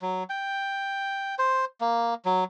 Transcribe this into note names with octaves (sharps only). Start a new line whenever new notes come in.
F#3
G5
C5
A#3
F#3